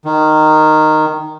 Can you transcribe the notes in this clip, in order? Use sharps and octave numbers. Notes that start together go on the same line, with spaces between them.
D#3